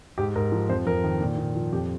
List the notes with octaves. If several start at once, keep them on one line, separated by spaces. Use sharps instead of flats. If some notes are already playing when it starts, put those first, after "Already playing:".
G#2 G4
G#2 A#4
F3
F2 C5
F2 A#4
D#3
A#2
A#2
F3
F2 G4